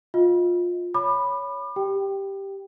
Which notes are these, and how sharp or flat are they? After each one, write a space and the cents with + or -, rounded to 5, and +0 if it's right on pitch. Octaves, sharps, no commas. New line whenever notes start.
F4 +15 D#5 +25
C#5 +10 B5 +0 D6 +40
G4 +0 G5 +0